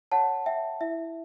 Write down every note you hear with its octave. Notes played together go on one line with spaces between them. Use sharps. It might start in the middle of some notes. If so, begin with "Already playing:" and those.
C#5 F#5 A5
C#5 E5 G5
E4 E5